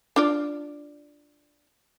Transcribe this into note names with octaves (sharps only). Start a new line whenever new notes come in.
D4 F4 D5